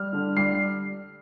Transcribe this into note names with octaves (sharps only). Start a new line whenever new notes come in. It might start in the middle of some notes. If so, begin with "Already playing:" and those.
Already playing: G3 F6
D3
G3 C7